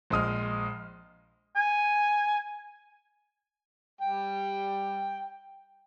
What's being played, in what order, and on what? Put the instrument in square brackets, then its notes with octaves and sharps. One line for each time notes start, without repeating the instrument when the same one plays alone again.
[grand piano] A#1 G#3 D#6 F6
[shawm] G#5
[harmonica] G3 G5